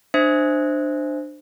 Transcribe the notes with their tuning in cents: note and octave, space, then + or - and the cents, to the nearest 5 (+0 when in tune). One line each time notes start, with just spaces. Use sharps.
D4 +25 C5 +0 E5 -10